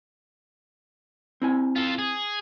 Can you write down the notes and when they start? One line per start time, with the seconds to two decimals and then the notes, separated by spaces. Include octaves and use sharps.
1.42 C4 E4 G#5
1.76 F4 A4
1.99 G#4